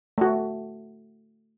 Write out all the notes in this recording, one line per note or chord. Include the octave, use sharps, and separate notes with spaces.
A3 F#4